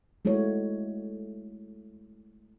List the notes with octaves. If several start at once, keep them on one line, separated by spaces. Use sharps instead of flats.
G#3 A3 E4 F#4 C#5